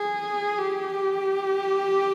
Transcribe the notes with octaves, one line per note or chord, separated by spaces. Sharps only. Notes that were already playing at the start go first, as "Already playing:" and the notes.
Already playing: G#4
G4